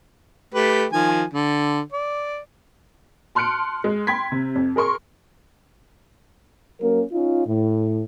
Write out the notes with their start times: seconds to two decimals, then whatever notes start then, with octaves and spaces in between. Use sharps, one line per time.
0.54 A3 G4 B4
0.92 D#3 F3 G#5
1.33 D3
1.92 D5
3.35 A5 C6 F6 F#6 C#7 D7
3.84 G#3
4.07 G5 B5 C6 G#6 B6
4.32 C3
4.55 F2
4.76 G#4 A#4 C6 C#6
6.81 F#3 A#3 C#4 A#4
7.12 C#4 D#4 F4
7.47 A2